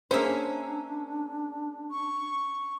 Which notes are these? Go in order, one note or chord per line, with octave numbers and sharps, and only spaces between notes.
A#3 C#4 D4 G#4 C5 E5
C#6